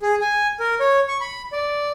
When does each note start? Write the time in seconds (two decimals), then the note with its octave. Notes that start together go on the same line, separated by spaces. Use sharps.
0.02 G#4
0.21 G#5
0.60 A#4
0.80 C#5
1.08 C#6
1.21 B5
1.52 D5